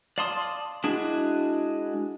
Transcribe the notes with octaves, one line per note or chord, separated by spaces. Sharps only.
D5 F5 A5 C6 D#6
G#3 D4 E4 F#4 G#4